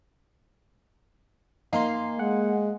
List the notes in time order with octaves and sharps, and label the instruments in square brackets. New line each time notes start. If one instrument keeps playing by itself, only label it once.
[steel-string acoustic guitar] A#3 F5 G#5 [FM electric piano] D#4 A#4 C6
[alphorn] G#3 [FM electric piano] F#5